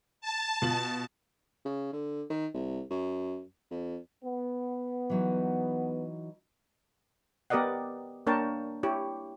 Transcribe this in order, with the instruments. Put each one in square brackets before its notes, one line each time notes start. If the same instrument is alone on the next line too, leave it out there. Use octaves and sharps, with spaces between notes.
[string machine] A5
[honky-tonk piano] B2 F4 F#7
[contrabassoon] C#3
D3
D#3
C2
F#2
F2
[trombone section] B3
[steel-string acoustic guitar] E3 F#3 D#4
[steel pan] B3 G4 A#4 D5 D#5 F#5
A#3 D4 A#4 C#5 G5 A5
E4 G4 C#5